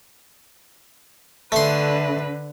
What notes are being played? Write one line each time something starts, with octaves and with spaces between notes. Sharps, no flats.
D3 A3 B4 C6